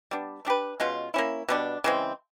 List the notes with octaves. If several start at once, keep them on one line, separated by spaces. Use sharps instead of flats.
G3 B3 D4
A3 D4 G4 B4
B2 G#3 C#4 F4
A#3 C#4 E4
B2 G3 B3 D4
C#3 E3 G#3 C4